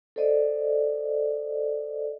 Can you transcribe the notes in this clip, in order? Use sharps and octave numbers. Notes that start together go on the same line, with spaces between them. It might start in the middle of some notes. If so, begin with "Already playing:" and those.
A4 C5 D5 D#5